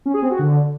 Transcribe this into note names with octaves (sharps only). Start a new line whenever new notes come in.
C#4
G#4
C4
F#4
D3